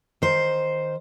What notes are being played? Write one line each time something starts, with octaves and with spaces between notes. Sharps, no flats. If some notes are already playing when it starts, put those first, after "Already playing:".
D#3 C5